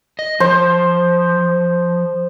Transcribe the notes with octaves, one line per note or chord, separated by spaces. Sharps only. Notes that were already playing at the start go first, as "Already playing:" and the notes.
D#5
F3 C5